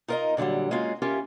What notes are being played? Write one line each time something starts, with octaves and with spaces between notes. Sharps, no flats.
D#4 F4 A#4 D5 D#5 A#5
A#2 D3 E3 F#3 G3
G#3 A#3 C#4 F4 F#4
C#4 E4 F4 G4 A#4